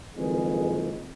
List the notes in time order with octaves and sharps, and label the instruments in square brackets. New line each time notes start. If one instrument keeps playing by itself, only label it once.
[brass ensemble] F#1 F2 D#3 G#3 G#4 B4